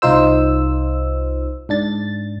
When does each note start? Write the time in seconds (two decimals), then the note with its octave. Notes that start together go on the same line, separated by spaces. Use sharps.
0.02 C2 D#4 F4 C5 E6
1.69 G#2 D4 A6